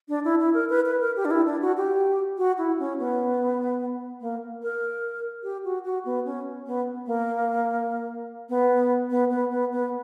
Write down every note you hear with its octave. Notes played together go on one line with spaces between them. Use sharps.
D4
E4
E4
A#4
B4
B4
A#4
G4
D4
E4
D4
F#4
G4
F#4
E4
C#4
B3
A#3
A#4
G4
F#4
F#4
B3
C#4
B3
A#3
B3
B3
B3
B3
B3